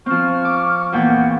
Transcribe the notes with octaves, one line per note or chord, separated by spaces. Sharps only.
F3 C4 C#6 F6
D6
E2 A#2 F#5 G5